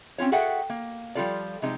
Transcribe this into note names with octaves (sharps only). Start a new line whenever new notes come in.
C4 C#4 F4 C#5
F#4 G#4 A4 E5 F#5 G5
A#3
F3 G3 D#4 F4 A4 D5
C3 F3 G3 G#3 D#4